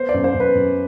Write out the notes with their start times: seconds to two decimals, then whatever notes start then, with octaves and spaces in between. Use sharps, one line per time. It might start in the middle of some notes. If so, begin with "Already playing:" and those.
Already playing: B3 C5
0.09 D5
0.14 F#2
0.24 C5
0.34 F#2
0.40 B4
0.55 F#2